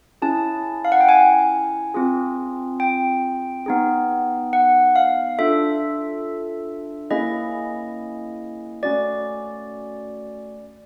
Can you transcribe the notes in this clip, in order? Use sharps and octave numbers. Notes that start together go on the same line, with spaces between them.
C#4 E4 G#4 A5
F5
F#5
G5
G#5
C4 F4 G#4
G5
B3 D#4 G#4
F#5
F5
D4 F4 A4 E5
A#3 C#4 E4 G#4 D#5
A3 C#4 F#4 D5